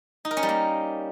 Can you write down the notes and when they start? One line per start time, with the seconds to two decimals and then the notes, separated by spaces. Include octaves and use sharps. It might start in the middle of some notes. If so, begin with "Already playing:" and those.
0.25 D#4
0.31 A#4
0.37 C#4
0.43 G3
0.49 A#3